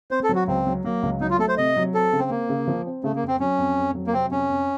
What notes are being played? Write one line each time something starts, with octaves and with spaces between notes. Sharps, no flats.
C4 C5
A4
F#3
F#4
C#2 C4
F#3
F#3 A#3
C#2
F#3 D#4
F4
A3 A4
C5
C3 D#5
F#3
C4 A4
C#3
C4
A#3 C4
C#3
F3
C4
C#3 A3
A#3
F2
C4
F#3 C#4
F2
F2
F#3
A#3
C3 C4
F2 C#4
F2